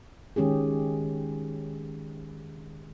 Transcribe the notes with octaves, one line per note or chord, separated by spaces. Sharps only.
D#3 G#3 C#4 G4 G#4